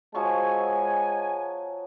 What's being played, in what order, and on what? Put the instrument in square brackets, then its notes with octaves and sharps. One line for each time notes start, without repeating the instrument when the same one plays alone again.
[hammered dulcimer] F3 F#3 C#6 [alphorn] G#3 [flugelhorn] G#5